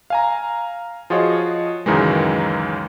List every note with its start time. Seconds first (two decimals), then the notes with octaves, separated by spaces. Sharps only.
0.10 F5 G#5 A#5
1.10 F3 F4 F#4 G#4 C#5 D#5
1.86 C#2 F#2 D#3 E3 G#3